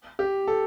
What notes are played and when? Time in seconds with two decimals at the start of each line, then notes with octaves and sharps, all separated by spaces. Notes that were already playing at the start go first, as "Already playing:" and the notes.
0.19 G4
0.47 A4